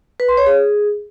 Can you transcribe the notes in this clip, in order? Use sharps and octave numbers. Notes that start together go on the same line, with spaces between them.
B4
C6
C#5
G#4